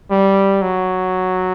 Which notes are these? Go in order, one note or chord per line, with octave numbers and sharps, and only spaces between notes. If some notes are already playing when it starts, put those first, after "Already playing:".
G3
F#3